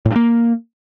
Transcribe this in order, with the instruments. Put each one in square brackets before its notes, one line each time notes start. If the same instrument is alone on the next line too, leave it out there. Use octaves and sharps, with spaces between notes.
[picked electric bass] A2
G2
A#3